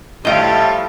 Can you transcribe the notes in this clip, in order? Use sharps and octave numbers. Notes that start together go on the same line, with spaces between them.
A2 F3 G3 A3 D#5 F5 G5